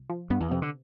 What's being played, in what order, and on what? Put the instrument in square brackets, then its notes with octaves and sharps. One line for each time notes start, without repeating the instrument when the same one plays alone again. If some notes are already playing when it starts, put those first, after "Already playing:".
Already playing: [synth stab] C2
F3
[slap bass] G2 [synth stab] B3
[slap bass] E2
[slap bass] F2 [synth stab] C3
[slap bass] D3